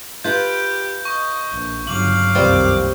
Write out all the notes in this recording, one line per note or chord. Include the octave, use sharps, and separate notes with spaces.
F4 G4 B4 G6
D#5 C#6
A#1
G1 C#3 F#3 F5 D6 F#7
F#1 C2 D#3 G3 C4 F4